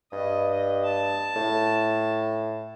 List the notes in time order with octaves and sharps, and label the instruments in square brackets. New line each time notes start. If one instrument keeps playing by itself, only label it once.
[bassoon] G2 [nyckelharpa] D#5
[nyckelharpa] D#5
A5
[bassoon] A2